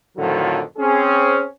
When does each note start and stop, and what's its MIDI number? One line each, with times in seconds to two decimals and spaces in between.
0.17 0.60 41
0.17 0.60 45
0.17 0.60 50
0.17 0.60 51
0.17 0.60 53
0.17 0.60 54
0.77 1.44 60
0.77 1.44 61
0.77 1.44 68